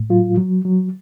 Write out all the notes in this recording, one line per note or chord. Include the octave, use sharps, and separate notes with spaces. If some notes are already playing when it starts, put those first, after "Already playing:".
Already playing: A2
F#3 F4
F#3
F#3